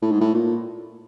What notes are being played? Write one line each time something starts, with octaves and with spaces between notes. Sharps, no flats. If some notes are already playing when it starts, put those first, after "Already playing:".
A2
G#2
A2
A#2